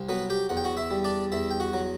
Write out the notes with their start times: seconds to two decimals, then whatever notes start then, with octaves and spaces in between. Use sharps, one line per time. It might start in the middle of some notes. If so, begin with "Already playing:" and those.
Already playing: C2
0.09 F#3 B3 B4
0.30 G4 G5
0.49 E2 F#5
0.57 G5
0.64 F#4 F#5
0.77 E4 E5
0.91 G3
1.04 D4 D5
1.32 E2 E4 E5
1.51 G5
1.60 F#4 F#5
1.74 F#3